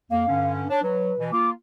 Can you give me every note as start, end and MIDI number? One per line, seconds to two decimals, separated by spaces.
0.11 0.24 41
0.11 0.24 58
0.11 0.52 77
0.28 0.64 43
0.28 0.64 50
0.28 0.64 61
0.70 0.81 62
0.70 0.82 73
0.83 1.12 54
0.83 1.22 71
1.19 1.30 47
1.19 1.30 52
1.32 1.52 58
1.32 1.52 65
1.32 1.50 86